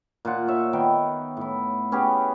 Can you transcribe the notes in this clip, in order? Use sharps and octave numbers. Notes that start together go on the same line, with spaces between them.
A#2 F4 F#5
C#5 E5
D#3 B3 G5
A2 E4
B3 C#4 G4 G#4